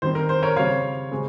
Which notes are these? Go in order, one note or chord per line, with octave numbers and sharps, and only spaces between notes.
D#3 G3 C4 C5
A#4
C5
A#4 C#5
C#3 G3 C4 C#5 F5
C#3 G#3 C4